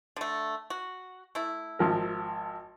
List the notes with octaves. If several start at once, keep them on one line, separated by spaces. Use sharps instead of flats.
D3 A3
F#4
A3 E4
G#1 F3 A#4